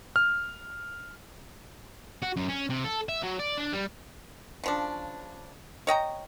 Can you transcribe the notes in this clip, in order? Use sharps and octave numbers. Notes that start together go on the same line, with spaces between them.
F6
F#4
F#2
C#4
C3
A4
E5
F#3
D5
D4
G3
C#3 F3 D4
C#5 D#5 G5 A#5